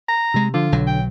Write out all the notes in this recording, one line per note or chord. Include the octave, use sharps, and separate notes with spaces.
A#5
C3 G#3
D3 F3 F4
B1 F#3
G5